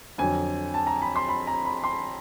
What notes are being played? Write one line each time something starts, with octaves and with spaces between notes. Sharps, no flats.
F2 D3 F#3 G#5
A5
A#5
B5
C6
B5
A#5
B5
C6